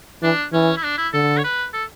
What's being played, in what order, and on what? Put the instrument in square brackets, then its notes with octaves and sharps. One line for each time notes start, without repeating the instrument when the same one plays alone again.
[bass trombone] E3 [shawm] D4
[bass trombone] E3 [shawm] C#4
[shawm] E4
D4
E4
[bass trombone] D3 [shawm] A4
[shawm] C#5
B4
A4